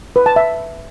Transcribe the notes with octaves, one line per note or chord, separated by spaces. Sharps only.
B4
A5
E5